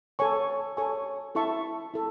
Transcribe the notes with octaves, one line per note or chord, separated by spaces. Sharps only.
A4 C#5 G#5 C#6
A4 C#5 G#5 C#6
E4 A4 E5 A5 C#6
E4 A4